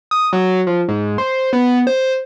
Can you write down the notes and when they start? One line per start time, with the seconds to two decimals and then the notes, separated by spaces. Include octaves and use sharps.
0.11 D#6
0.33 F#3
0.67 F3
0.88 G#2
1.18 C5
1.53 B3
1.87 C5